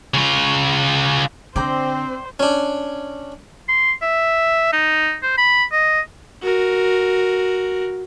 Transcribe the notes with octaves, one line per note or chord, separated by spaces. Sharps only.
C#3 F4
D3 C4 C5 D5 G5 A#5
C#4 D4
C6
E5
D#4
C5
B5
D#5
F#4 A#4